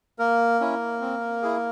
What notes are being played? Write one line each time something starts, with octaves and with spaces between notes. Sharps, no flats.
A#3 A#4
C#4 E4
C4
E4 G#4